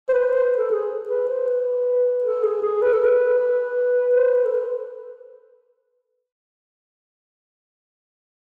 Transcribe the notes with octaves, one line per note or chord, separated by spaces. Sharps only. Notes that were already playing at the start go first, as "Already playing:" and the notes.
C5
B4
C5
A4
G#4
B4
C5
B4
A4
G#4
G#4
B4
A4
B4
B4
C5
B4
A4
B4